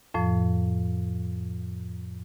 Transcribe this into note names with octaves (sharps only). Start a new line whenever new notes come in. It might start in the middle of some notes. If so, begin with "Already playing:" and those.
F2 A2 F3